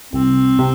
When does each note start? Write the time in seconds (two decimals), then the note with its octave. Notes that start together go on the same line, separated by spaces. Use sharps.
0.13 C2 C4
0.59 C3